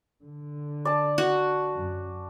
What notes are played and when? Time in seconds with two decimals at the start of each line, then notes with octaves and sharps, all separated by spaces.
0.24 D3
0.85 D5 A5
1.18 F#4
1.77 F#2